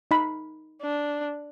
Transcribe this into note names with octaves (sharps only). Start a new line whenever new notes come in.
D#4 B5
D4